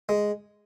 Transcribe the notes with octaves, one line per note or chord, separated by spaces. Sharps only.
G#3